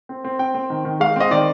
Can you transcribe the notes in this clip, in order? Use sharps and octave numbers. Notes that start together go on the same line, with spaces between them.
C4
C4
C4 G5
C4
D#3
D#3
G#3 F5
C4 D#5
D#3 D5